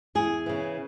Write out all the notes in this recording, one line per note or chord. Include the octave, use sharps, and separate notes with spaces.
E2 G#4
C#3 E3